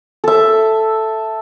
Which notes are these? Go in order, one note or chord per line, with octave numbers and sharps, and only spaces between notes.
A4 E5